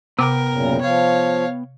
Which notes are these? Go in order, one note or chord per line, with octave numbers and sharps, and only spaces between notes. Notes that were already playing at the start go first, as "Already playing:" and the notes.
C3 B3 A#4 G5 D6
F#2 A#2 C#3
F3 C#5 F5